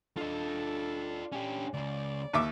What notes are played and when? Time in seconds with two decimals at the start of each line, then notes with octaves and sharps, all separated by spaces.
0.17 D4 F4 A4 D#5
1.32 C#4 G4
1.74 C#2 C#3 D5
2.33 D#2 E5 D6